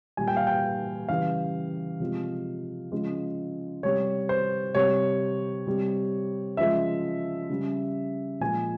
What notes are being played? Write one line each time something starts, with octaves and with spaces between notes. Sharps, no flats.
A#2 G3 G#5
G5
F5
G5
C#3 E3 G3 F5
C3 F3 G#3
C#3 F3 G#3
C3 G3 C#5
C5
C3 G3 C#5
C3 G3
C#3 F3 G#3 E5
C#3 G3
A#2 F3 G#3 G#5